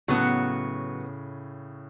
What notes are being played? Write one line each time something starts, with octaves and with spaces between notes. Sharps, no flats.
A2 C#3 F#3 B3 F#4